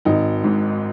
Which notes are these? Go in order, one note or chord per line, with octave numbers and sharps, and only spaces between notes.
G#1 D#4
G#2